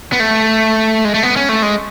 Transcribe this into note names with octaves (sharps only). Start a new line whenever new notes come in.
B3
A3
G#3
A3
B3
C#4
A3
G#3